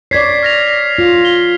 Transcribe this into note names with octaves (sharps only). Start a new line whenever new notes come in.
C#5 D5 G#6 B6 C7
F6 A#6 F7
F4
G7